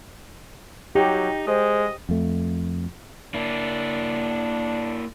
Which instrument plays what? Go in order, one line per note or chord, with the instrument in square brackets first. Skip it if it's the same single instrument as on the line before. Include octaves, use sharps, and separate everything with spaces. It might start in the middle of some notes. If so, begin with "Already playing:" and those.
[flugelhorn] F#3 [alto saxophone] D#4 [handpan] G4
[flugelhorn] G#3 [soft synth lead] C5 [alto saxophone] D#5
[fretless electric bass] F2 A3
[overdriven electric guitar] A#3 E4 [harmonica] D4